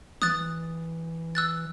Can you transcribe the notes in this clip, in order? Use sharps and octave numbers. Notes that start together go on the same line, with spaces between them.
E3 D#6 F#6 A6
E6 F#6 A6